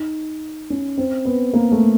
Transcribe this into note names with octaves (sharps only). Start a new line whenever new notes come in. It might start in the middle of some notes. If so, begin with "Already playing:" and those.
Already playing: D#4
C#4
C4
B3
A#3
A3